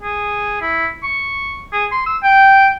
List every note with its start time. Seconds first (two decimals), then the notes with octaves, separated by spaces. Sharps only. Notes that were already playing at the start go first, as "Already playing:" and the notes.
0.02 G#4
0.61 E4
1.03 C#6
1.73 G#4
1.92 C6
2.06 E6
2.23 G5